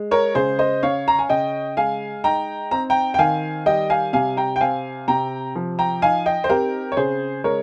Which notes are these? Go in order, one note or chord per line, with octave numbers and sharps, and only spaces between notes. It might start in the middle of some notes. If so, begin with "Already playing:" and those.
Already playing: G#3
A#4 C#5
C#3 G#4 C5
C5 D#5
C#4 C#5 F5
A#5
G#5
C#3 D#5 G5
G#3 F5 G#5
D#4 G5 A#5
C4 A#5
G5 A#5
G5
D#3 F5 G#5
G3 D#5 G5
F5 G#5
C3 F5 G#5
G5 A#5
G5
C4 F5 G#5
C3 G5 A#5
F3
G5 A#5
D#4 F5 G#5
D#5 G5
C5
C4 G4 A#4
C#5
C#3 G#4 C5
G#3 A#4 C#5